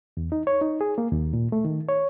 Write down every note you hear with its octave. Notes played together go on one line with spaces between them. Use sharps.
E2
D#4
C#5
D#4
G#4
A#3
D#2
A#2
A3
D#3
C#5